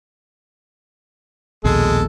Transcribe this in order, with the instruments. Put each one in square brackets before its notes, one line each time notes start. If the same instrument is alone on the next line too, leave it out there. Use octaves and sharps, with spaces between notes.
[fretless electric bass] A#1 D#2 B2 [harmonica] G#3 A4